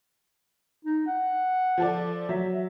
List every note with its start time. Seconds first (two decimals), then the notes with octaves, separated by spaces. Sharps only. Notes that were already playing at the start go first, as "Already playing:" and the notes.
0.85 D#4
1.07 F#5
1.78 F3 A4 D5
2.29 F#3 E5